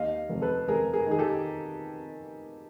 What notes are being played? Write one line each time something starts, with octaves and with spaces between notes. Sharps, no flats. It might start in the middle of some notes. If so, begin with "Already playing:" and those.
Already playing: D#2 D#5 F5
F1
A4 B4
F1 G#4 A#4
G#4 A#4
D#3 G#4
G4 A4